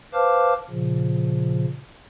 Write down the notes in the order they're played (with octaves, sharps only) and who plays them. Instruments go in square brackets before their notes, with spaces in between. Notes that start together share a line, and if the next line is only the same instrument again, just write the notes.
[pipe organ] B4 C5 F5 A5 D6 F6
A#2 C#3 F3